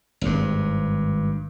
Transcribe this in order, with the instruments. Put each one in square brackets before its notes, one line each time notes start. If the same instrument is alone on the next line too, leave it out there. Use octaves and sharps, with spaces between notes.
[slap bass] G#1 G2